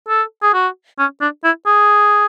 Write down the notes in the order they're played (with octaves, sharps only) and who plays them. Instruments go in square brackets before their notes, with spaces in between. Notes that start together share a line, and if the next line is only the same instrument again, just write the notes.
[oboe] A4
G#4
F#4
C#4
D4
E4
G#4